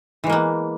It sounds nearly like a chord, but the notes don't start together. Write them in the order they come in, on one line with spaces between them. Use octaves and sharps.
E3 G#3 A#3 B3